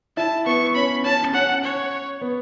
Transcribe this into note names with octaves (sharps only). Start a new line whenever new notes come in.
E4 A5
B3 C#6
C#4 B5
C#4 A5
C#4 F#5
C#5
B3